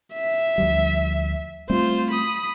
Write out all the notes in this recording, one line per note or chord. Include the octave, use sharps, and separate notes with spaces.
E5
D2 F3 G3
G3 A3 C4 F4 C5
B5 D#6